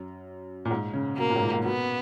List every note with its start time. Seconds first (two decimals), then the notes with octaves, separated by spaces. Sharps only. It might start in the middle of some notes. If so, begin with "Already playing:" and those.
Already playing: F#2
0.65 A#2
0.71 G#2
0.94 C#3
1.18 B2 A#3
1.30 A#2
1.36 G#2
1.41 A#2
1.53 G#2
1.65 B2 B3